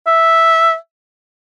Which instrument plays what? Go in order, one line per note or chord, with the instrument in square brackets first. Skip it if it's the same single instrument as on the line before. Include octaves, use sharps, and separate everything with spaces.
[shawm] E5